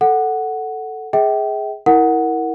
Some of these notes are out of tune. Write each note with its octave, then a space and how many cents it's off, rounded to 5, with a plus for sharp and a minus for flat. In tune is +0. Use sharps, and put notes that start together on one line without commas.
A4 +0 F#5 +5
G#4 +5 E5 -40 G5 -20
E4 -25 A#4 +0 F#5 +0